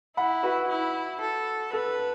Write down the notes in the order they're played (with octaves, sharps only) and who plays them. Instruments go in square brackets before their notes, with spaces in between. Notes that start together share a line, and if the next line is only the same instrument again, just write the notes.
[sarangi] E4 [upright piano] F#5 B5
[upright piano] F#4 B4
[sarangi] E4
A4
[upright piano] A4 [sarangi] B4